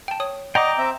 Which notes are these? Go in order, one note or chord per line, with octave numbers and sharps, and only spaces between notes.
G5 A5
C#5 D#6
D5 D#5 F#5 G5 A#5 C6 D6
C4 E5